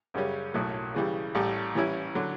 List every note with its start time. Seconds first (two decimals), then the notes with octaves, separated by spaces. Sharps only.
0.14 F#2 C#3 G3 C#4
0.54 B1 A2 F#3
0.94 C#3 E3 G3
1.35 A1 A2 G3
1.75 E3 G3 C#4 E4
2.15 D3 F#3